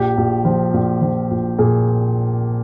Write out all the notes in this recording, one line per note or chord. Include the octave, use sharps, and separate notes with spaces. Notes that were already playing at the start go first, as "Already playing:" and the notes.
Already playing: A#1 G4
A#1
F3
A#1
F3
A#1
A#2 G#4